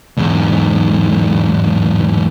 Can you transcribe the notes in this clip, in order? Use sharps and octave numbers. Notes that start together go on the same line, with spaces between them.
E2 G#2